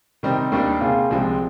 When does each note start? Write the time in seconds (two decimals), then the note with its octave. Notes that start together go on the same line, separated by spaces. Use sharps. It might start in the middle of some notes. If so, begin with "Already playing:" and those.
0.23 C3 D#3 G3 C4 D#4
0.52 D#2 D#3 G3 D4
0.81 C3 G3 A#3 F4 G#4
1.11 C2 C3 F3 G#3 C4